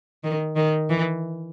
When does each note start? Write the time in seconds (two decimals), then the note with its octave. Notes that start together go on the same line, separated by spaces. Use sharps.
0.24 D#3
0.56 D#3
0.90 E3